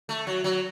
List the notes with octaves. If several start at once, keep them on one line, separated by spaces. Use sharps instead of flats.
A3
F#3
F#3